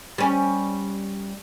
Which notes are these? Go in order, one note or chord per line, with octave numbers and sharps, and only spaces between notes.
G3 C#4